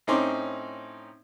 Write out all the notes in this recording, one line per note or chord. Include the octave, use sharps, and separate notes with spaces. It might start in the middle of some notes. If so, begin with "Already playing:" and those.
A2 C4 C#4 D#4 C6 D6